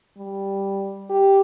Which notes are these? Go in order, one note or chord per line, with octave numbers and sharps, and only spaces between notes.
G3
G4